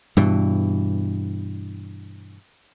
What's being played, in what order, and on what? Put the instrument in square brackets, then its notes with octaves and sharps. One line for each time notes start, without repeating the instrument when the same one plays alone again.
[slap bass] G2 B2 E3